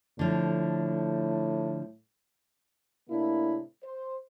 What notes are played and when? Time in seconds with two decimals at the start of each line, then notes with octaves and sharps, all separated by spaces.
0.19 A2 D3 F3
3.09 A2 C3 A#3 D4 E4
3.83 C5